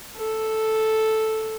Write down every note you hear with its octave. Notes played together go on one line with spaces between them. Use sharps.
A4